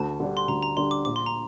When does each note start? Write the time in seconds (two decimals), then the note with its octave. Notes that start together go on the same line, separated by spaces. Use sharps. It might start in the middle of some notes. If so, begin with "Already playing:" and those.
Already playing: D2 A5
0.20 D3 G3 D4
0.37 C6
0.48 D2 A#5
0.62 A#5
0.77 D3 G3 D4 C6
0.91 D6
1.05 A#1 D6
1.16 C6
1.26 A#5